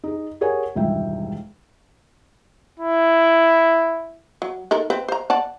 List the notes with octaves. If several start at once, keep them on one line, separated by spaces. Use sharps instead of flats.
D#4 G#4
G4 G#4 A#4 C#5 F#5 G#5
E1 C#2 G2 D#3 E5 G5
E4
F#3
D#4 A4 A#4
C4 B4
C5 A#5
D5 F#5 A5